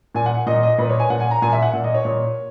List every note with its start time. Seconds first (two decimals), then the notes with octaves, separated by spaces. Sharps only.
0.15 A#2 G#5
0.26 F#5
0.46 A#2 D#5
0.63 D#5
0.78 A#2 B4
0.89 C#5
1.00 G#5
1.10 A#2 F#5
1.20 G#5
1.31 A#5
1.42 A#2 G#5
1.53 E5
1.62 F#5
1.73 A#2
1.84 D#5
1.94 C#5
2.05 A#2